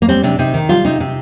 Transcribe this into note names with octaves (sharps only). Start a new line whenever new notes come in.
A#3
G3 C4
C3 D4
C3 D#4
D#3
G3 F4
C3 D#4
C3